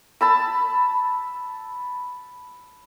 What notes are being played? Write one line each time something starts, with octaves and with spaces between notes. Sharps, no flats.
A5 B5 E6